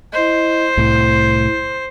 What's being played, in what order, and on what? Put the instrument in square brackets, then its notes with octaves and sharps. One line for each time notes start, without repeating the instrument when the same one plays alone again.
[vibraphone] E4 D#5 [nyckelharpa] C5
[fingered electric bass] C2 A2 [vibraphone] E4